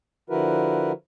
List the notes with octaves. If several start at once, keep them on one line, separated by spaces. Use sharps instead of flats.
D3 F3 E4 F#4 A#4 B4